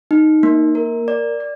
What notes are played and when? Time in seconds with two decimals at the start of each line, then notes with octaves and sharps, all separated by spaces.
0.11 D#4
0.43 A#3
0.75 A#4
1.08 D5
1.40 D5